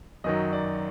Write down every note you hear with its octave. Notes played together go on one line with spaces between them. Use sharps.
F#2 D#3 F#3 D#5
D5